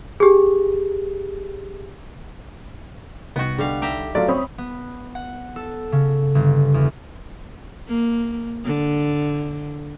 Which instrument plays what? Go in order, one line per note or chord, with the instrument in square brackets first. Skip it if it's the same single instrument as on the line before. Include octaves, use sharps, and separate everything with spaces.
[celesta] G4 G#4
[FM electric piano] C2 D#4 G5 [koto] B3 F#4
[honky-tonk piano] D3 [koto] G3 F5
[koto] G4 E5 A#5
[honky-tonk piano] F#3 A3 F4 [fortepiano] D5
[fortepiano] C4 [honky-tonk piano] C#5 B5 D#6
[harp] B3
F#5
A4
C#3
G1
E2
[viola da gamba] A#3
D3